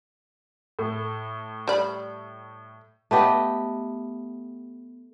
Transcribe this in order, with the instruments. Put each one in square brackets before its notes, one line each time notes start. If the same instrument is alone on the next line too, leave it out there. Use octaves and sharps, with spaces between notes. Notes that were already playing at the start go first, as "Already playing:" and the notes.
[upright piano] A2
[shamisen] G3 D5 B5
[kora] A3 B3 G4 D#5